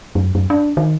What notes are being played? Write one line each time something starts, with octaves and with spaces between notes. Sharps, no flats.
F#2
F#2
D4
D#3